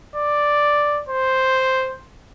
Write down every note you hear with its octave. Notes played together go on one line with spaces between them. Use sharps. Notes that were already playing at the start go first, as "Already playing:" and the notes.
D5
C5